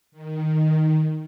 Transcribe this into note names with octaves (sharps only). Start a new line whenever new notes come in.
D#3